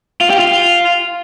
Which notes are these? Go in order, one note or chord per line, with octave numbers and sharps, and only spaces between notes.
F4
G4
F4